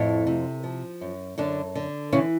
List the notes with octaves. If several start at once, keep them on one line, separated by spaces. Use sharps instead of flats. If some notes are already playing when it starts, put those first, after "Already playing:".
Already playing: F2 A2 A3
C3
F3
F#2
F#2 D3 D4
D3
C#3 E3 C#4